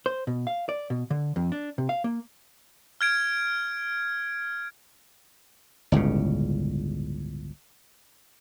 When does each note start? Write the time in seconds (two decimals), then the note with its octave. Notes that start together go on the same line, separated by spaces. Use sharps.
0.06 C5
0.27 B2
0.47 F5
0.69 D5
0.90 B2
1.10 D3
1.36 F2
1.52 D4
1.78 C3
1.89 F5
2.04 A#3
3.01 F6 G#6 D7
5.92 G1 C#2 A2 C#3